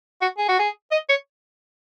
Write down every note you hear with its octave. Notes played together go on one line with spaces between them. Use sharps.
F#4
G#4
F#4
G#4
D#5
C#5